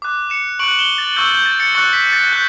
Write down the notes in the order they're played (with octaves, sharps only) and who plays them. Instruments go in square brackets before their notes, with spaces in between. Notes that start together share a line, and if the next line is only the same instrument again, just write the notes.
[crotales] D6 F#6
C#7 E7
C#6 D7 F#7
F#6
E7 G7
A6
C#6 E6 G6 A6
G6
A6
A6 C#7
C#6 F#6 A6 C#7
B6
A6
F#6 G6